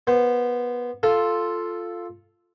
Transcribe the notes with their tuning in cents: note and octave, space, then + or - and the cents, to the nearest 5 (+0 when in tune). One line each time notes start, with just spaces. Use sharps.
B3 -20 C5 -25
F4 +0 A4 +0